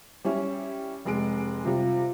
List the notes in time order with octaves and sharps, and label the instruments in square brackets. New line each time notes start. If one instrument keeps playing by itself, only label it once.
[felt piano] G3 C#4 E4
F1 G#3 D7
[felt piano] C3 G3 [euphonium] F4